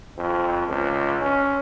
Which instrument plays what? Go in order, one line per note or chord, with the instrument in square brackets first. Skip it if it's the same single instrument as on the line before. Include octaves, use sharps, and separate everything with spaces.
[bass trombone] F2
C#2
C#4